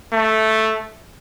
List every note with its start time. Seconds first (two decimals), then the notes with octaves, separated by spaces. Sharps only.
0.13 A3